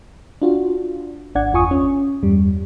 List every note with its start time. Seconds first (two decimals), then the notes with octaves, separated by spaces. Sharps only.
0.42 D4 F4 F#4
1.35 G#1 D4 D5 F#5 G#6
1.53 G1 E2 F4 G#5 C#6 D#6
1.71 C#4
2.23 E2 G2 G3